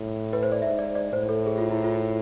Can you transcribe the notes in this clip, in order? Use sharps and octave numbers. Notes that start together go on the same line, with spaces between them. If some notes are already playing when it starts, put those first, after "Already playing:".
Already playing: A2
B4
C5
D5
G#2 E5
D5
D5
A2 C5
A4
G#4
F4
E4
F4